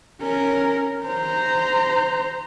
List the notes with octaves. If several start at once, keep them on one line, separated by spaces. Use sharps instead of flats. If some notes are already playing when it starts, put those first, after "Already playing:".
C#4 A#4
C5 A#5